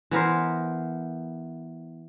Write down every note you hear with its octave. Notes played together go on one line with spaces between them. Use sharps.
E3 B3 A#4 C5